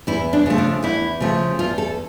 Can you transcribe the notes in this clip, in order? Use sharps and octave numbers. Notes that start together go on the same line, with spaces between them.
E2 E4
D4
C#3 F3 A3
D4
E2 E4
C#3 F3 A3
E2 F4
A4